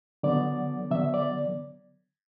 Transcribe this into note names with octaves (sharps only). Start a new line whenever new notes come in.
D3 F#3 B3 D5
D3 F#3 B3 E5
D5